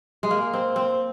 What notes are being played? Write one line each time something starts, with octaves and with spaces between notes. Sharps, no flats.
G#3
A#3
C4
C4